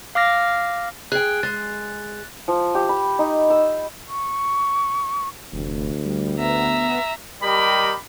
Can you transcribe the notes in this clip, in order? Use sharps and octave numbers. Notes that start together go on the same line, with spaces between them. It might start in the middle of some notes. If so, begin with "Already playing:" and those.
F5 D6 F6 A#6
G#4 G5 F#6
G#3 A6
F3
G4
B5
D#4
E6
C#6
F1 D2
G3
B3 E5 A#5
G3 G4 A#4 D#5 B5